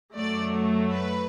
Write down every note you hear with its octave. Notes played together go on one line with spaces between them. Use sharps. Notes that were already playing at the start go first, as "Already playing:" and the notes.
F#2 F#3 A3 D5
B4